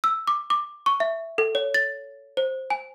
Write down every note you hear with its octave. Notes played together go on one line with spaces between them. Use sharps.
E6
D6
D6
C#6
E5
A4
C#5
A6
C5
G#5